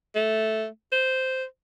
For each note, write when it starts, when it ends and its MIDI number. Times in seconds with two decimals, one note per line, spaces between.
0.15 0.66 57
0.92 1.44 72